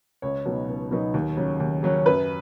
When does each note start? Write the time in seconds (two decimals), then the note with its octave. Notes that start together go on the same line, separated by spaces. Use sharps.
0.22 C#2 C#5
0.46 B2 F#3 B3 D#4
0.68 C#2
0.91 B2 F#3 B3 D#4
1.14 D#2
1.37 C#3 F#3 C#4
1.60 D#2
1.83 C#3 F#3 C#4
2.06 F#2 B4